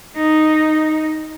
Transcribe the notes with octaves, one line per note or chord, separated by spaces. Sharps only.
D#4